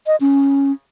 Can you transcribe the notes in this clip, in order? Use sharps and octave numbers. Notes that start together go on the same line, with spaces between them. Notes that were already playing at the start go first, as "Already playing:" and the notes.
D#5
C#4